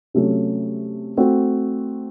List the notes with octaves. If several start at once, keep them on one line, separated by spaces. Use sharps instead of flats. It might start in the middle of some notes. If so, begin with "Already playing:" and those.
C3 F#3 A3 C#4
A3 C4 F#4